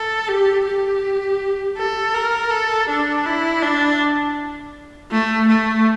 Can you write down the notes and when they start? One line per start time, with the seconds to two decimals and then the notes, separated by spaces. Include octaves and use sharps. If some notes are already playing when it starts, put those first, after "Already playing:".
Already playing: A4
0.29 G4
0.66 G4
1.77 A4
2.15 A#4
2.50 A4
2.89 D4
3.26 E4
3.62 D4
5.11 A3
5.48 A3